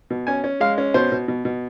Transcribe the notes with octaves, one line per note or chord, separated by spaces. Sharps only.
B2
C#4 G#5
C#4
G#3 F5
C#4
B2 C5
B2
B2
B2